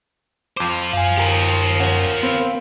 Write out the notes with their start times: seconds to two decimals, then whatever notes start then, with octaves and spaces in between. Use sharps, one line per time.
0.57 F2 F4 C5 D6
0.93 F#2 F5 G#5
1.18 G4 A#4
1.80 C#4 F#5 E7
2.23 B3 C4 F5 B5